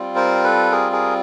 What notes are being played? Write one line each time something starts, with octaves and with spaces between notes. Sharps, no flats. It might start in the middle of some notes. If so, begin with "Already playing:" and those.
Already playing: G3 C4 F4
A#4 C5
A4 B4
G#4 A#4
G#4 A#4